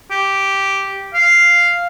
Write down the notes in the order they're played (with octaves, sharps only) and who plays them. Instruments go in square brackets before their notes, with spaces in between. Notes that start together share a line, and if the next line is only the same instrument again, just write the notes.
[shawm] G4
F5